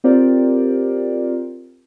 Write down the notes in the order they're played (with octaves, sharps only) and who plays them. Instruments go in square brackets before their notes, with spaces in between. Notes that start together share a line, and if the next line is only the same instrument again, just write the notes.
[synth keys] C4 F4 G4 A#4 C5 D5